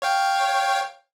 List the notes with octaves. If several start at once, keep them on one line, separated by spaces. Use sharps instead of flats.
C#5 F5 G5